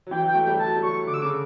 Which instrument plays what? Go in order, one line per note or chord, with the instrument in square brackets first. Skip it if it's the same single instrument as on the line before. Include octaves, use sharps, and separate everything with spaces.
[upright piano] F#3
[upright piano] E3 [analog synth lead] G5
[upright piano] F#3 [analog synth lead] G5
[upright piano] A3
[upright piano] G3 [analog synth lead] G5
[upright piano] F#3 [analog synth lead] A5
[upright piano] G3
[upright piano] F#3 [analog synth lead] C#6
[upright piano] D3 [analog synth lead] D6
[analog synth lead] E6
[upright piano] C#3 [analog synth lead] D6